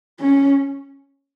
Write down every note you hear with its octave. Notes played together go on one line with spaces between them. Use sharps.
C#4